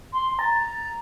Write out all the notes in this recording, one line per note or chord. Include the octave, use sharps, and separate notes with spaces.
C6
A#5 A6